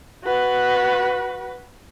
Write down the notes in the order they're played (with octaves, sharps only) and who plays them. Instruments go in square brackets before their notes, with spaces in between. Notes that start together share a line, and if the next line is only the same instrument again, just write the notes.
[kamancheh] F#4 B4